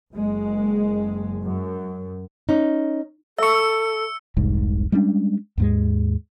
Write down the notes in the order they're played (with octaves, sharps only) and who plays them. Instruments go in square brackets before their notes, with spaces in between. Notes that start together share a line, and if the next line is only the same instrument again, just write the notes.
[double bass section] F#1 G#3
F#2
[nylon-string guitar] C#4 D#4
[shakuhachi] A4 [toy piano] E5 C#6 [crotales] E6 C#7
[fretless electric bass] F1 C2 G#2
G3 G#3 C#4 D4
D#2 G#2 G#3